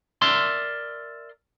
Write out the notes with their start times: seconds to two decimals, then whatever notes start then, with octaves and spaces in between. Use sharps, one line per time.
0.22 A#4 D5 E5 C6